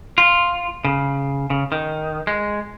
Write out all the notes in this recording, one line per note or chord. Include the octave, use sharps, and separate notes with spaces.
F4
C#3
C#3
D#3
G#3